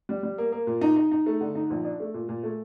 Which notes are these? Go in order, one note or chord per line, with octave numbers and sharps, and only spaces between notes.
G3
G3
A#3
A#3
A#2
D#4
D#4
D#4
A3
D3
D#4
A#1
D4
A3
A#2
A#2
A3